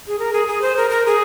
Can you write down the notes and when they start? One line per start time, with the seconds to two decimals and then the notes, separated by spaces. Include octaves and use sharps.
0.07 G#4
0.19 A#4
0.33 G#4
0.47 G#4
0.62 C5
0.77 A#4
0.90 A#4
1.06 G#4